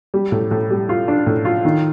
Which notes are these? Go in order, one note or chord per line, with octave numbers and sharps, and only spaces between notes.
G3
A2
A2
G3
F4
D4
A2
F4
D#3